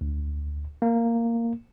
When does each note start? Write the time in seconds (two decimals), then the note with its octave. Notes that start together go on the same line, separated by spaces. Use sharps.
0.01 D2
0.82 A#3